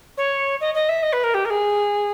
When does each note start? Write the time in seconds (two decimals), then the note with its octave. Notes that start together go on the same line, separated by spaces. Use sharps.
0.17 C#5
0.61 D#5
0.74 D#5
0.89 E5
1.03 D#5
1.13 B4
1.24 A#4
1.34 G4
1.45 A#4
1.50 G#4